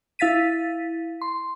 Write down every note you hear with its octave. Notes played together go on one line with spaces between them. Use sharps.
E4 F5 A6 B6 D#7
C6